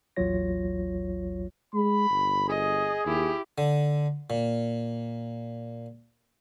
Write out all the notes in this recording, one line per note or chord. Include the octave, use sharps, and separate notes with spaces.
A1 D#2 F#3 F4 C#5 A#6
G#3 B5
G1
G#4 D#5
D#2 E4 G4
D3
A#2